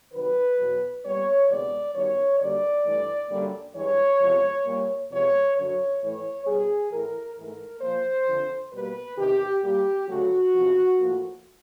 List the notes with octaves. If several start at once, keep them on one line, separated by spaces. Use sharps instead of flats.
C3 D#3 F#3 B4
E2 B2 F#3
A#2 G3 B3 C#5
D2 C3 E3 G#3 B3 D5
F#2 D#3 G3 B3 C#5
F#2 D3 G3 A#3 D5
G2 E3 A3
F#2 D3 G3 A#3
G2 E3 G#3 C#5
E2 C3 F3 G#3
A#2 G3 A#3
E2 C3 F3 G#3 B3 C#5
F#2 D3 F#3 C#5
A2 E3 A3 C#5
B2 G3 B3 G#4
A2 E3 A3 A#4
G#2 E3 A3 A#4
A#2 F3 A#3 C5
F2 D3 F3
B2 G3 A#3 B4
E2 C3 D#3 G4
A#2 G3 A#3 G4
D2 C#3 F#3 A3 F#4
E2 C3 F3
A2 F3 A#3